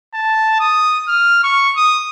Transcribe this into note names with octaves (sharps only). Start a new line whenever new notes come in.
A5
D#6
F6
C#6
D#6